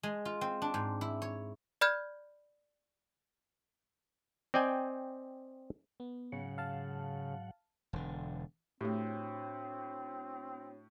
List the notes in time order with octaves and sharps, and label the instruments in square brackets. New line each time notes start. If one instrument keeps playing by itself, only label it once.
[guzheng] G#3
F4
C4
D4
G#2
E4
C#5
[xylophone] D5 B5 F6 G6 G#6
[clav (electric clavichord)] C4 D5 D#5 G5 G#5
[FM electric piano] B3
[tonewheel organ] G#2 F#3 F#5 [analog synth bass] C#3
[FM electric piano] F5 A5
[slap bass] E1 D3
[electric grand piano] A2 [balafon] A3 G4 [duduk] C4 [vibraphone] D4 F#4 C#5